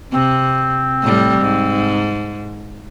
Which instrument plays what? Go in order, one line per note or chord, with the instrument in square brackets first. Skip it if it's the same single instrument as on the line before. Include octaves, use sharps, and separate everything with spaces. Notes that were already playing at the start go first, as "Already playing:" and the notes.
[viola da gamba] C3 [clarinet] C4
[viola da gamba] A2 G3
G#2